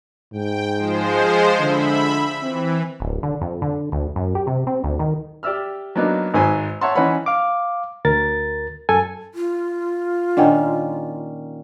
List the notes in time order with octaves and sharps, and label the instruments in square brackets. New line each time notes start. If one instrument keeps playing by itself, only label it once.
[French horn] G#2 [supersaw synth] G5
[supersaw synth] F3 G#3 C5
[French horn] D3 [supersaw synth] E5 B5
[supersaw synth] E3 [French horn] C4
[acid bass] D1
D3
F2
D3
D2
F#2
G4
C3
C4
D2
D#3
[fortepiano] G4 D5 E5 E6 F6
F#3 A#3 B3 D4 D#4
G#1 G#2 B4 C5 G#5 B5
C#5 E5 F#5 A5 C6
E3 C#4 D#4 B4 F#5 B5
[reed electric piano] F5 D6
D2 A#4 A6
F#2 A4 G#5
[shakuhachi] F4
[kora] A#2 D#3 C#4 [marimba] D4 F#5 G5